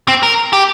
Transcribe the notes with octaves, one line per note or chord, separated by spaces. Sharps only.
C4
A#4
G4